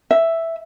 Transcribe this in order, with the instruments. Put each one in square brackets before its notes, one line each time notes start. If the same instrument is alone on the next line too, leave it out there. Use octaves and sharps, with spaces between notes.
[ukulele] E5